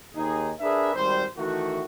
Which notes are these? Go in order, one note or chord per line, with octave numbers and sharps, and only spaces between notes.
D#2 D#4 G#4
D4 G#4 A#4 B4 E5
G#1 G3 C5
D#3 E3 A3 F#4